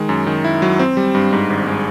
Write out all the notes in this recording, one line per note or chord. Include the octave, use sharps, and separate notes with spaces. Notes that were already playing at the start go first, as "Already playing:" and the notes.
Already playing: D#3 G#3
F#2
D#3
E4
F#3
C4
G3
G2
G#2
G#1
G#3